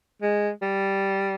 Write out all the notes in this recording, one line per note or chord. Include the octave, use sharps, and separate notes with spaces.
G#3
G3